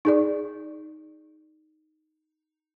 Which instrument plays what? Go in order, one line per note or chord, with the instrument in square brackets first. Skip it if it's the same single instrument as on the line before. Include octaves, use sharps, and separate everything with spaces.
[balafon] D#4 G#4 D5